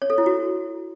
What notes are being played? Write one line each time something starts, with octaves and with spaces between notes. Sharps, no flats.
C#5
A4
E4
F#4